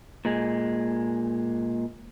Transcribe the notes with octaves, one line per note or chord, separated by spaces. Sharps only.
A#2 G#3